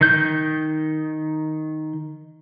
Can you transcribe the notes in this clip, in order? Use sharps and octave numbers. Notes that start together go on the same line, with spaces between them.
D#3 G6